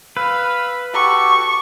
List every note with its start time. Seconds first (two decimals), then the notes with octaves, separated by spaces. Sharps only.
0.17 B4 F5 E6
0.94 F#4 G4 A4 C#6